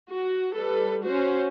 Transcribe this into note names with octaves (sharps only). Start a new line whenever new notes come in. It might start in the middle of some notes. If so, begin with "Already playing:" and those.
F#4
G3 A4 B4
C#4 F#4 C5